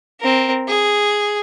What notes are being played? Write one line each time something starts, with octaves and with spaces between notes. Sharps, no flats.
C4 A#4
G#4